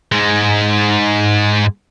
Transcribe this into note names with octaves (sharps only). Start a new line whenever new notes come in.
G#2 G#3